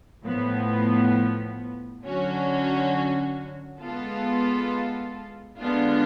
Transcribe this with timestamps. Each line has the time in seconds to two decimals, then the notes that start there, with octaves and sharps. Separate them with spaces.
0.24 A2 F3 B3
2.03 D3 F#3 C#4 F#4
3.81 G#3 B3 F4 A4
5.59 D3 G#3 B3 D4 F4